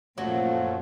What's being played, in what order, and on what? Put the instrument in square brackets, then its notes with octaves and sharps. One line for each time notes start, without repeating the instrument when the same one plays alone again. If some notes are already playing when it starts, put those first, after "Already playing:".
[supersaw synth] F#2 A3 [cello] A#2 [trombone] F3 [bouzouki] F#3